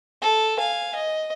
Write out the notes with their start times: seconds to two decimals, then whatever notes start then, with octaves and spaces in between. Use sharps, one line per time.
0.21 A4
0.58 F5 G#5
0.95 D#5